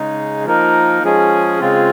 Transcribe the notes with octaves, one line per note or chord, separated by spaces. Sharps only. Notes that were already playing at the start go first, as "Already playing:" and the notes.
Already playing: C#3 G#3 D#4
F3 A#3 D#4 A#4
F3 G#3 C#4 G#4
C#3 G#3 C4 F4